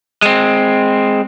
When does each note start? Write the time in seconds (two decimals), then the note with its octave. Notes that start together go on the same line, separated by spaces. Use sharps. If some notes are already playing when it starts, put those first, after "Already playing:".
0.22 G#3 C4